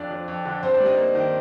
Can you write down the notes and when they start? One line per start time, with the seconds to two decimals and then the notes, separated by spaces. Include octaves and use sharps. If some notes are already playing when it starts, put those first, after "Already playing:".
Already playing: F2 D4 D5
0.10 F3
0.28 F2
0.45 D3
0.63 G2 C4 C5
0.74 D4 D5
0.80 G3
0.86 D#4 D#5
0.97 A#3
1.15 D#3